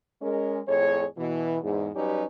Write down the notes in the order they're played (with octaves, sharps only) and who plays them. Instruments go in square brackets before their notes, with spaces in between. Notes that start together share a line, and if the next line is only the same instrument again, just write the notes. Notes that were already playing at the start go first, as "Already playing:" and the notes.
[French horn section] G#3 C#4 A#4
F2 A2 G#4 C#5
B2 E3
E2 G#2
F#3 G3 C#4 D#4 G4 B4